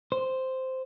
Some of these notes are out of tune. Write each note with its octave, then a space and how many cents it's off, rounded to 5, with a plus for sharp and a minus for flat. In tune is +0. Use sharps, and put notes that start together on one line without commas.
C5 -5